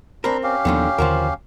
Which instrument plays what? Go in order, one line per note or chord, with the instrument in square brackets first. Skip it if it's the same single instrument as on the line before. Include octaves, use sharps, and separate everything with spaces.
[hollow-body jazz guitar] C4 A#4 [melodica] D4 A#5 B5
[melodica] C#4 G4 F5
[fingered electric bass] D#2 F3 B3 [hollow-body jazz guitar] A#2 D3 D#3
[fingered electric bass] D#2 D3 [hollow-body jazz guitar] F3 F#4 A#4